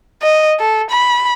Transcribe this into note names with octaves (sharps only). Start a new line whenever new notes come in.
D#5
A4
B5